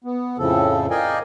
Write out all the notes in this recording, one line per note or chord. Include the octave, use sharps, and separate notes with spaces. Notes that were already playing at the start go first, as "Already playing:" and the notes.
B3
F2 A2 C#3 F3 A4
A#4 D5 D#5 F5 G5 G#5